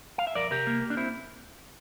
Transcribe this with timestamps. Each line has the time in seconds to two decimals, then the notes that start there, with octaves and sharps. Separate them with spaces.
0.18 F5
0.27 E5
0.35 F2 A#4 D5
0.51 C3 G4 A#4
0.67 A#3
0.82 A#3
0.90 D4
0.97 C4 E4